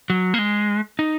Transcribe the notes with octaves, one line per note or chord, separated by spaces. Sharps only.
F#3
A#3
G#3
D#4